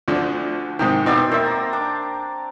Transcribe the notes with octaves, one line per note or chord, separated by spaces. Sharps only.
D2 D3 F3
G#2 C3 D#3 G5
B2 C4 D#4 D5 E5
A#3 C5 E5
A#5
D4 D6